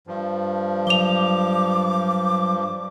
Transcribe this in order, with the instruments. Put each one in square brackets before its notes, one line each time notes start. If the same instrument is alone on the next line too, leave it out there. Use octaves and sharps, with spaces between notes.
[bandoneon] G2 F3
[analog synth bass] F#3 [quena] D6 [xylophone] F7 G7